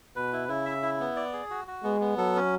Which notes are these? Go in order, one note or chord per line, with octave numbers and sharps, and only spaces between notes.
B2 B4
E4
C#3 E4
E5
E4
B3
D5
G#4
F#4
F#4
G#3 B3
B3
F#3 A4
C#4